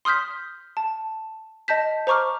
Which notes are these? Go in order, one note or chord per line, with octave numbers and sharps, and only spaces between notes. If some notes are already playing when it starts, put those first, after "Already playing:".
C6 D#6 F6 G6 B6
A5
D#5 A5 G6 B6
C5 A#5 C#6 D6 F6